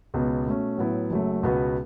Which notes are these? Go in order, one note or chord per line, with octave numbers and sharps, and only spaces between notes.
C#2 B2 B3
B2 A3 C#4
A2 F#3 B3 E4
F#1 F#2 F#3 A3
C#2 B2 B3 F#4 B4